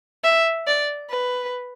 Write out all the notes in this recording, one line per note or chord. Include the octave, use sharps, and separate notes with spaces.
E5
D5
B4